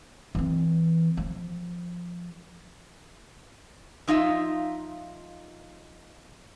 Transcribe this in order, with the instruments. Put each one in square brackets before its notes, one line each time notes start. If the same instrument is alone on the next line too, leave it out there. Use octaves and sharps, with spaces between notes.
[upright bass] E3 C4
F3
[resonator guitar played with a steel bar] F3 D#4 F4 E5